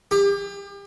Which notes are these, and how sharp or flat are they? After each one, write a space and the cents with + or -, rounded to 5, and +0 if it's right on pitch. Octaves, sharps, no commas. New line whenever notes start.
G4 +35